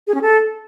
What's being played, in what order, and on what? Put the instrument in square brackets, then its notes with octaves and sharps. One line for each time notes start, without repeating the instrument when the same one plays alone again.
[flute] G#4
C#4
A4